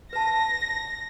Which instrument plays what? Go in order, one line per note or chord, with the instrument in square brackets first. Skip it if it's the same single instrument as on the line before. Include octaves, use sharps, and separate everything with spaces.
[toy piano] B4 A5 [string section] A#6